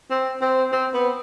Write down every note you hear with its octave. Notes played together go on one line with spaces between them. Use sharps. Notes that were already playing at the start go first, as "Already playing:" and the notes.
C4
C4
C4
B3